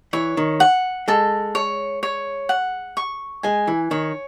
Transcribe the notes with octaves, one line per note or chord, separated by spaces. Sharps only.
E3 C#5
D#3
F#5
G#3 A4
C#5
C#5
F#5
C#6
G#3 G#5
E3
D#3 C#5